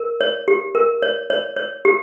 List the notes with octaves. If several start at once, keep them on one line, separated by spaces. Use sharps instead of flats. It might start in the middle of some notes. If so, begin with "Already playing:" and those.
Already playing: A#4
C#5
G4
A#4
C#5
C#5
C#5
G4